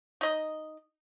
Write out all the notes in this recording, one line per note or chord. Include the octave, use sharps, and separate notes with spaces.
D#4 D#5